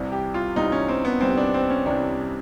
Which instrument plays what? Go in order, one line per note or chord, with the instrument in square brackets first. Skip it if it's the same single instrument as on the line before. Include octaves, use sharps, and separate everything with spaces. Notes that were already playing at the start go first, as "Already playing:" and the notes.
Already playing: [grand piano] C2 C3 E3 G3
G4
F4
C2 C3 E3 G3 D#4
C#4
C4
B3
C2 C3 E3 G3 C4
D4
C4
C#4
C2 C3 E3 G3 D4